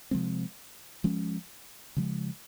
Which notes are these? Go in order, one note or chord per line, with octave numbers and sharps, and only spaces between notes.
C3 F3 G#3 C4
F3 G#3 C#4
C#3 F3 G#3